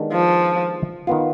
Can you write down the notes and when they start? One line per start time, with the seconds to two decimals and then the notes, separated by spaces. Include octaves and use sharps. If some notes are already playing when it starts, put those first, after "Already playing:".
Already playing: D#3 G#3 B3 D4 G4
0.12 F3
1.07 D#3 B3 F4